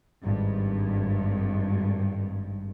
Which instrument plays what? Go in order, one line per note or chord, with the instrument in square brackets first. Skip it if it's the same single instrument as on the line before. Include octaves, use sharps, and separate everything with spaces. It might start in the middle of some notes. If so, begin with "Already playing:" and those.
[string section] G#1 G2